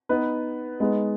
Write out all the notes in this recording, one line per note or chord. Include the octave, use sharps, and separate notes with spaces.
B3 D#4 B4
G#3 B3 D#4